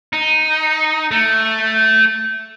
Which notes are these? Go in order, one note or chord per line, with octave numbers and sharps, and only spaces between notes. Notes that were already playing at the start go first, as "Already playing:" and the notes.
D#4
A3